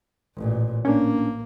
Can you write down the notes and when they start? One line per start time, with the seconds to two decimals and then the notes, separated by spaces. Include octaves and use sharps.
0.36 A1 A#2
0.85 A#3 C#4 D4